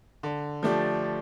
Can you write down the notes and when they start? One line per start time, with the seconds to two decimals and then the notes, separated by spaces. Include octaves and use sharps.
0.23 D3
0.63 F3 A3 D4 G4